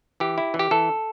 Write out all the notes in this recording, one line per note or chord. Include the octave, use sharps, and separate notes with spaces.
E3 G4
E4
E3
G4
E3 A4